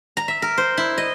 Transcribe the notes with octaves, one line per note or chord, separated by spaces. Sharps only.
A#5
E5
A#4
C5
E4
D#5